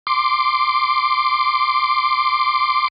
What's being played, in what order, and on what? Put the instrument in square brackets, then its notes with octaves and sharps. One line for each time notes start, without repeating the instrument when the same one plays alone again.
[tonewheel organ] C6 D6